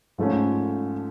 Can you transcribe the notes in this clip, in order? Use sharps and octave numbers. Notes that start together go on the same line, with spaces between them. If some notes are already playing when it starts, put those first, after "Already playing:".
G#2 F3 A3 C#4